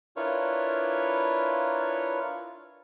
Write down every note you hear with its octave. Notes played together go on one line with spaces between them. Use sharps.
D4 E4 F4 A#4 B4 C#5